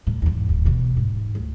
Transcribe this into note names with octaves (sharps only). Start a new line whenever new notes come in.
A2
E2 G#2
D#1
E2 B2
G#2
D2